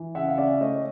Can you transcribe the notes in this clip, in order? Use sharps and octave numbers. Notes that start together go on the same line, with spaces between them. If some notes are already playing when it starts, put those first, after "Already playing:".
Already playing: E3
C#3 E5 F#5
F5
C#4 D5 E5
A3 C#5 D#5